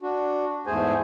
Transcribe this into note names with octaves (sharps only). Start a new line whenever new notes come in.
D4 F#4
E2 G#2 A3 G#4 C5 G#5